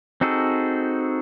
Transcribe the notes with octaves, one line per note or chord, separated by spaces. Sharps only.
C4 D#4 F#4 G#4 A4